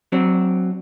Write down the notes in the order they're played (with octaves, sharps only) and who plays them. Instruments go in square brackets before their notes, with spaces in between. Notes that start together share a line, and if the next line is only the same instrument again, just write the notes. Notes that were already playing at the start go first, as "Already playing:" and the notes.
[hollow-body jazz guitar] F#3 C4 D4